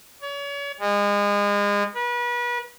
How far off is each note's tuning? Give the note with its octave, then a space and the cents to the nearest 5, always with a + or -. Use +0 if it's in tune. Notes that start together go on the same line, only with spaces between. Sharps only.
C#5 +35
G#3 -30
B4 -35